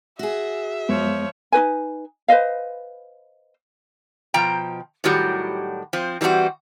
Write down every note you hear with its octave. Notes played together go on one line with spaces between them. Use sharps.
F#4 G#4 E5
F#2 F3 G#3 B3 C#5
D#4 F#4 B4 G#5
B4 C5 D#5 F5
B2 F3 G5 A#5
A2 D#3 F#3 G3 F#4 G4
F3 C4
E3 G3 C4 D4 F#4